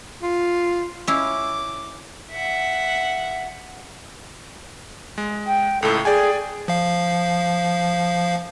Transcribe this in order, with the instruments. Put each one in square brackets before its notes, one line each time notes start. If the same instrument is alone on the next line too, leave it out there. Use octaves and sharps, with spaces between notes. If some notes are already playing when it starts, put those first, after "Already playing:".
[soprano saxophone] F4
[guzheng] C#4 E4 F5 [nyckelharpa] D6
[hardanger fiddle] E5 F#5
[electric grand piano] G#3
[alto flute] G5
[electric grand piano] C#2 A2 [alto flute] A4
[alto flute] G#4 [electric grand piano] D5 G5 G#5
[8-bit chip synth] F3 F5